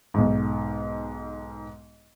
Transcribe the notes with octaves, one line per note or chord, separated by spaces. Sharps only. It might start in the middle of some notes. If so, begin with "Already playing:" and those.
B1 G#2